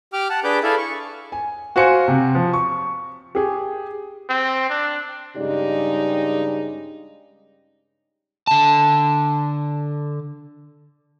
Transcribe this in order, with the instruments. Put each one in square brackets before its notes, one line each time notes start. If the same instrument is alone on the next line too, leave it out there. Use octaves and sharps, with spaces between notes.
[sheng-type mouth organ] G4 G5 D6 F6
F#5 A5
D4 G#4 B4 D6 G6
E4 G#4 A4 D5 E5 F5
C#6
[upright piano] G#5
F#4 C5 F5 G#5 C#7
C3
F3
C#6
G4 G#4
[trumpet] C4
D4
[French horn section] G2 C#3 G#3 D#4 G4 D5
[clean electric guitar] D3 A5